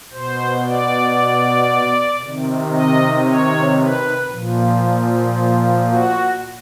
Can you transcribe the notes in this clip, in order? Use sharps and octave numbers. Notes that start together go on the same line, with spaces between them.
B2 C5
D5
C3 D#3
D#5
C#5
B4
A#2 F3
F#4